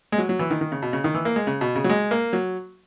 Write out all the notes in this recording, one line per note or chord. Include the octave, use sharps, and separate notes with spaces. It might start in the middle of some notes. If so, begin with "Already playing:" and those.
G#3
F#3
F#3
E3
D#3
D#3
C#3
B2
C#3
D#3
E3
A#3
G#3
C#3
B2
C#3
F#3
G#3
A#3
F#3